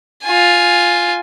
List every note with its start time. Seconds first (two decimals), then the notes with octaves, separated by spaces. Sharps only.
0.23 F4 G#5